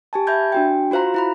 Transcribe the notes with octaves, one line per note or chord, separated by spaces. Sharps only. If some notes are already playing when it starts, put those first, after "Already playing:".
G4 G#5 A5
E5 B5 G6 G#6
D4 F#4 G5
F4 F#4 C5 F5 A#5
E4 A#5 B5